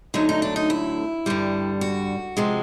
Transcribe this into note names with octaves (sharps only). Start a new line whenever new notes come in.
D2 D3 F#3 A3 D#4
D#4
D4
D#4
E4
G2 D3 G3
F#4
C3 F3 G#3